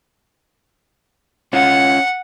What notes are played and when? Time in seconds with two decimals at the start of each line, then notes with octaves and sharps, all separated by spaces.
1.53 C#4 F4 F#5